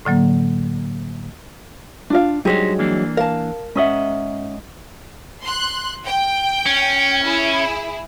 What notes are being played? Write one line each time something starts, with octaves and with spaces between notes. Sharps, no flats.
A2 D3 F#3 A#3
D4 F4 F5
G2 F#3 G#3 D#4 G4 G#4 C5
E3 A#3 D4
A#4 F5 A5
G#2 C#4 D#5 E5 F#5
C6 F#6
G5
C#4
E4 G#4